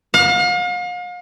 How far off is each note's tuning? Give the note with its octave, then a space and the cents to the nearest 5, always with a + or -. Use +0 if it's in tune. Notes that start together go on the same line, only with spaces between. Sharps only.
F5 +40